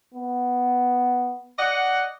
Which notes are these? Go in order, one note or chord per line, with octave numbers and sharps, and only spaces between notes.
B3
D5 D#5 F#5